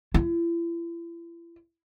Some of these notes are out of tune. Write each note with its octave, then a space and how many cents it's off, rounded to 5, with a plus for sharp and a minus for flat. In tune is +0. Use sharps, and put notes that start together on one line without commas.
E4 +40